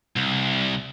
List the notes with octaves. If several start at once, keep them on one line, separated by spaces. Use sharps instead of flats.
C2